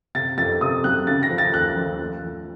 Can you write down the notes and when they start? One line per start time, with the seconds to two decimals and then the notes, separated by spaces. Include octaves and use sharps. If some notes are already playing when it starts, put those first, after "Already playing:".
0.15 C3 A6
0.38 F2 A6
0.61 C3 D#6
0.84 F#3 F#6
1.07 C#3 A6
1.23 A#6
1.30 F3
1.38 A6
1.54 D#2 F#6
1.77 F3
2.00 A3
2.24 F3